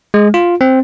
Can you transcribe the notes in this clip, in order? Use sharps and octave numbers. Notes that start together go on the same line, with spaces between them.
G#3
F4
C4